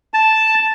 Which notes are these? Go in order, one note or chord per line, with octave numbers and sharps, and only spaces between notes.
A5